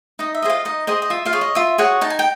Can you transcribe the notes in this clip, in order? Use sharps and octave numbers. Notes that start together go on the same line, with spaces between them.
D#4 D#5
E5
G#4 C5 D#5
F4 F5
D#4 D#5
G#4 C5 D#5
D#5
F4 E5
F4 F5
G#4 C#5
D#5
F4 E5
F#4 G#4 C#5 F#5
D#4 A5
G#5
G5